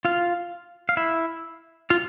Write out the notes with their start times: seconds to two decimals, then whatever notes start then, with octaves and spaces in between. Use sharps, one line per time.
0.05 F4 F5
0.89 F5
0.97 E4 E5
1.90 F4 F5